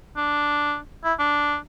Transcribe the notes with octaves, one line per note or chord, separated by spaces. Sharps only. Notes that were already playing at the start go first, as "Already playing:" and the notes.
D4
E4
D4